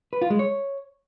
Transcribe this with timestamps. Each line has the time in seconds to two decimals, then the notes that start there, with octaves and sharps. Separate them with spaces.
0.13 B4
0.21 F4
0.30 G#3
0.39 C#5